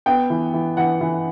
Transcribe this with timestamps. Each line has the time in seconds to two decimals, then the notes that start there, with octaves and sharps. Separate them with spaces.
0.06 B3 G5
0.30 E3
0.54 E3
0.77 E3 F#5
1.01 E3